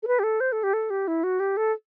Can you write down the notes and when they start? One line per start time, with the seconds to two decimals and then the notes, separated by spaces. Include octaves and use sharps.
0.03 A4
0.07 B4
0.19 G4
0.23 A4
0.40 C5
0.52 A4
0.63 G4
0.73 A4
0.90 G4
1.08 E4
1.24 F#4
1.40 G4
1.57 A4